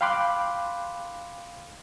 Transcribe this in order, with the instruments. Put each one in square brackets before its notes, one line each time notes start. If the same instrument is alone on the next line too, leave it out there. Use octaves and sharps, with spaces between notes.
[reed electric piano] F5 G5 B5 C6 D6 F#6